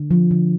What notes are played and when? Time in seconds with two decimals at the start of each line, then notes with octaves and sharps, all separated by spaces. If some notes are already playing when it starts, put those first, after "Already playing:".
Already playing: D3
0.11 F3
0.31 D3